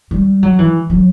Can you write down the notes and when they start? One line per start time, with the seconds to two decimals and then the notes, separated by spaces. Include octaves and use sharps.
0.11 G3
0.43 F#3
0.59 E3
0.90 F#3